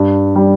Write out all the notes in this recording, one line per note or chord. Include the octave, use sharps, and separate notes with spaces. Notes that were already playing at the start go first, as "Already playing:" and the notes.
Already playing: G2
G3